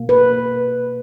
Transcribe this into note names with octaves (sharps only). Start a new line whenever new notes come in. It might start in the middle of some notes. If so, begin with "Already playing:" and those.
Already playing: B2 A#3
B4